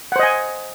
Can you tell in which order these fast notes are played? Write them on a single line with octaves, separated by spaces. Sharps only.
F#5 C5 D#5 G#5